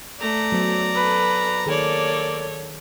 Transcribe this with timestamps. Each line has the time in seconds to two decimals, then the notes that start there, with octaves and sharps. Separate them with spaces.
0.21 A3 D5 A#5
0.52 F#3 B3 C5
0.95 A4 B4
1.66 D#3 A#3 G#4 A4 C#5 D5